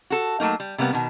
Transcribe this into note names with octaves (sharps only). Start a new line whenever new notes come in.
F#4 A4
F#3 A3 A#3 D#4
G3
C3 G3 A#3 B3
B2 D#3